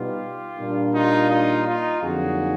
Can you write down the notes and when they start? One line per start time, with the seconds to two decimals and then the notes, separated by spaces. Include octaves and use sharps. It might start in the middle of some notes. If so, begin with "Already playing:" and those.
Already playing: B2 G3 B3 D#4 F4 G4
0.58 A#2 G3 A#3 D4
0.94 D#4 F4
1.30 D#4 F4
1.67 D#4 F4
2.02 F2 D3 F#3 A#3 D#4 F#4 G#4